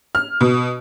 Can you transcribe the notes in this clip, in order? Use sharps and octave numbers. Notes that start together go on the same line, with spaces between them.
F6
B2